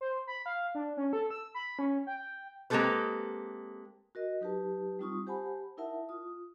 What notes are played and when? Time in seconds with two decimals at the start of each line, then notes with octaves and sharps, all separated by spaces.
0.01 C5
0.27 B5
0.46 F5
0.75 D4
0.97 C#4
1.13 A4
1.30 E6
1.55 B5
1.79 C#4
2.07 G5
2.70 G#3 A#3 C4 G4 A4 B4
4.15 F#4 A#4 D#5
4.41 F#3 D#4 G4 B4 A5
4.99 G3 C4 D#4 F4 C#6 D#6
5.27 G4 C5 F#5 G#5 A5 B5
5.77 D#4 E4 A#4 E5 F#5 A5
6.09 F4 D#6